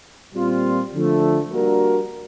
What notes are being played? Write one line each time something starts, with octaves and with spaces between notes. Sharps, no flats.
A#2 G3 C4 F4
D3 F3 A3
G3 A#3 D4 F#4 A#4